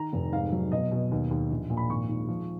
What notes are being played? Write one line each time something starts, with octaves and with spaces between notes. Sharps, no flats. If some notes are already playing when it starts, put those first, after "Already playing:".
Already playing: D#3 A#5
F1
G#2 F5
F#3
B2 D#5
B2
D#2
D#2
A#1
A#2
B5
G#1 C#6
G#2
F3